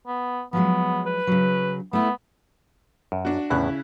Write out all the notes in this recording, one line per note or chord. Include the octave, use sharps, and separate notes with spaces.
B3
F3 F#3 G#3 B3
B4
C#3 F#3
A3 B3 E4
F#2
D4 F#4
E2 A2 C#3 E4 F#6